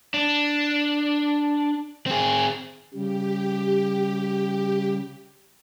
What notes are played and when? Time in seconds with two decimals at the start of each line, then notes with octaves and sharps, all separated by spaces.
0.14 D4
2.06 C4 G#4
2.94 C#3 G3 G4